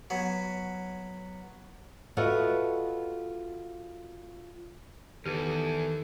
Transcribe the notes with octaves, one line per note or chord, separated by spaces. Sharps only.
F#3 B3
F4 F#4 A4 B4 D#5 E5
E2 D#3 G4 A4 B4